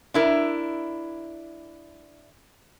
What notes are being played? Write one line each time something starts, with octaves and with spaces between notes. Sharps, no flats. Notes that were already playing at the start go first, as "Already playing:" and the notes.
D4 E4 A#4